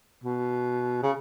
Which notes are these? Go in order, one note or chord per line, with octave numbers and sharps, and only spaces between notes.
B2
C#3